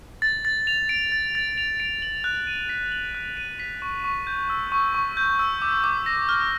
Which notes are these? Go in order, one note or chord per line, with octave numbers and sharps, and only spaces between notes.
A6
A6
F7
D7
A6
A6
F7
D7
F#7
F#6
D#7
B6
F#7
F#6
D#7
B6
C#6
C#6
G6
E6
C#6
C#6
G6
E6
D6
D6
A#6
F6